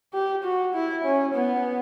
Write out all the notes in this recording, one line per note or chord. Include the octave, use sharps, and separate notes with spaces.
G4
F#4
E4
C#4
B3